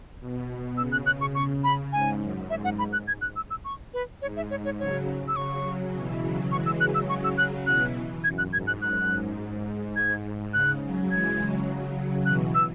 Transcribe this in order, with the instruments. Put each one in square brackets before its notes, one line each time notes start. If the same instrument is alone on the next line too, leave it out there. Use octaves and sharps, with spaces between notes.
[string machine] B2
[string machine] C#3 [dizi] E6
[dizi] F#6
F#6
C#6
C#6
B5
[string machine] G#2 [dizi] G#5
[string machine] F#2
[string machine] G#2 [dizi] E5
[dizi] F#5
B5
F#6
G#6
F#6
E6
E6
C#6
B4
[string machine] G#2 [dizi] C#5
[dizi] E5
C#5
C#5
[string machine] C#3 F#3 [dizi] C#5
[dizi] E6
[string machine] C#3 F#3 [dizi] C#6
[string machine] B2 E3
C#3 F#3
[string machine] E3 G#3 [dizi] C#6
[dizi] E6
[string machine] C#3 F#3 [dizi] F#6
[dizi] E6
[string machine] C#3 F#3 [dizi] C#6
[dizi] E6
F#6
[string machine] B2 E3 [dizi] F#6
[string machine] F#2 [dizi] G#6
[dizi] F#6
[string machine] G#2 [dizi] G#6
[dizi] F#6
[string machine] F#2 [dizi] F#6
[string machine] G#2
[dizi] G#6
[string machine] C#3 [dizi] F#6
[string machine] C#3 F#3
[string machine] E3 G#3 [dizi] G#6
[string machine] C#3 F#3
[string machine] B2 E3 [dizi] F#6
[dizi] E6